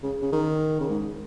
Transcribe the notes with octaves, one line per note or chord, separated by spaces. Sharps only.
C#3
C#3
D#3
C#3
G#2